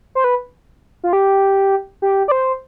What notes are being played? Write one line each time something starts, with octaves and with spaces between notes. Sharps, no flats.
C5
B4
F4
G4
G4
D5
C5